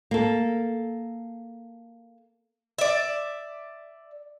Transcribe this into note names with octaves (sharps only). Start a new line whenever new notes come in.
A#3 A4
D5 E5